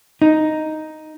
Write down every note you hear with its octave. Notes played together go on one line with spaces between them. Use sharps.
D#4